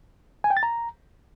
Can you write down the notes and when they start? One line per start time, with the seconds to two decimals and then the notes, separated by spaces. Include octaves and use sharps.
0.44 G#5
0.50 G5
0.57 A6
0.63 A#5